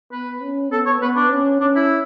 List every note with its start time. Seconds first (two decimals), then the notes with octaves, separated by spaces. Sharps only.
0.12 B3 B4
0.42 C#4
0.72 B3 A4
0.86 C#5
1.01 B3 B4
1.16 D4
1.31 C#4
1.61 C#4 D4
1.75 E4